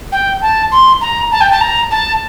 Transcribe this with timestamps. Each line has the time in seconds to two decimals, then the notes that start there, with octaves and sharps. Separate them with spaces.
0.12 G5
0.42 A5
0.72 C6
1.01 A#5
1.32 A5
1.41 G5
1.51 A5
1.61 A#5
1.91 A5